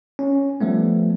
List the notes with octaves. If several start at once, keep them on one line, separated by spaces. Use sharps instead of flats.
C#4
F3 G3 A3 B3